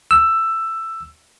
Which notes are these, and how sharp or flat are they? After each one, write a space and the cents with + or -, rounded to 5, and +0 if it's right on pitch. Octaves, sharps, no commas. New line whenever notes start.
E6 +10